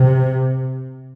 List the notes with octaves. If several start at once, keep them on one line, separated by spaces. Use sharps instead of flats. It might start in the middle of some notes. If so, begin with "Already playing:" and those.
Already playing: C3